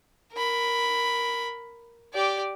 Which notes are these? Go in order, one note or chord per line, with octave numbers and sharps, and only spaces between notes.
A#4 B5
G4 D5